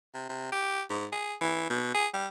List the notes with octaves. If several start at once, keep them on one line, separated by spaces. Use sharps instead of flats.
C3
C3
G4
G#2
G#4
E3
B2
G#4
G3